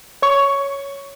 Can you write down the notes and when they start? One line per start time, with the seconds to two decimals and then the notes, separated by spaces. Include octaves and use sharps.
0.22 C#5 C#6